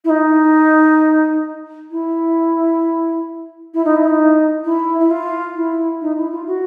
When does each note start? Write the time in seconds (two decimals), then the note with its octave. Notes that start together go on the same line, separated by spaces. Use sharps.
0.04 E4
0.09 D#4
1.91 E4
3.74 E4
3.85 D#4
3.96 E4
4.07 D#4
4.64 E4
4.99 E4
5.10 F4
5.56 E4
6.01 D#4
6.16 E4
6.32 F4
6.46 F#4